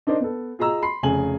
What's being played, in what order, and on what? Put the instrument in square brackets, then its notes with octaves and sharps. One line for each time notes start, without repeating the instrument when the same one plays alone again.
[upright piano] D4 D#4 A#4 C5 D5 D#5
B3 A4
F4 G#4 D#5 A#5 E6
B5 C6 C7
F1 C#3 G#5 F#7